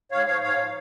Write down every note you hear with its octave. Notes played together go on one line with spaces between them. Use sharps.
G#2 C#5 F5
F3 C#5 F5
G#2 C#5 F5
F3